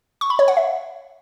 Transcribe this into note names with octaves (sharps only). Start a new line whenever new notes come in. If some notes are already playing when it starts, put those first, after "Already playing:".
C#6
B5
C#5
F#5
E5